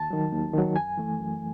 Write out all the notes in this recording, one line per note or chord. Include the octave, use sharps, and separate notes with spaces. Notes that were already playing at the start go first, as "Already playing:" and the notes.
Already playing: D#2 A5
D#3 F#3
D#2
D#3 F#3
F#2 G#5
E3 A3
F#2